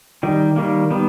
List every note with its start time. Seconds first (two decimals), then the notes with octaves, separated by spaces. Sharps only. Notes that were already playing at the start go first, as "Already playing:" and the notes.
0.23 D#3 G3
0.56 D#3 G3 A#3
0.90 D#3 G3 B3